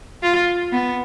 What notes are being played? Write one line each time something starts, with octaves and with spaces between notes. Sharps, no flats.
F4
B3